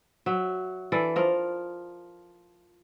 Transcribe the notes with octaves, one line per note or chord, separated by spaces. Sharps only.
F#3 E5
E3 A4 D5
F3 A#4